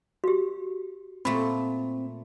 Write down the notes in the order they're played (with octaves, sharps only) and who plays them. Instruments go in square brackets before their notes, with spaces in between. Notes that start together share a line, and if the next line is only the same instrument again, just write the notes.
[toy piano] F#4 G4
[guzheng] A#2 A3 [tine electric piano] C4 [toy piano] B5